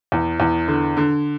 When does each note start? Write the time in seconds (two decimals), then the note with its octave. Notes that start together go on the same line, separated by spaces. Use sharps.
0.12 E2
0.40 E2
0.68 D3
0.97 D3